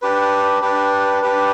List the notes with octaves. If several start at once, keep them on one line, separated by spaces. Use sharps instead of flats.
D4 G4 B4
D4 G4 B4
D4 G4 B4